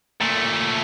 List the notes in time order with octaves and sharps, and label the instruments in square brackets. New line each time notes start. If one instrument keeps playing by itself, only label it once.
[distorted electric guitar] A#2 A3